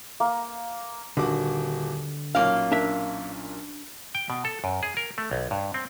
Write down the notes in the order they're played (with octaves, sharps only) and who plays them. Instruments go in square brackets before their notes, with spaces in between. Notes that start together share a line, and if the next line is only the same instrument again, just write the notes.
[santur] A#3
[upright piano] D#1 F#4 D6 [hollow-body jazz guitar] D3
[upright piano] B1 A#2 C#4 [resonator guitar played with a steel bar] A#3 F5
[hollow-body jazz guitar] D4 A#4 E5
[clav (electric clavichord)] G5
B2
A4
F#2
G#4
A#4
A3
B1
G2
C4